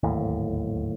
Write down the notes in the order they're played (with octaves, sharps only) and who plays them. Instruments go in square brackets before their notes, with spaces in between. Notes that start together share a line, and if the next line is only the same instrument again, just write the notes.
[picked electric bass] D1 G#1 D#2 A2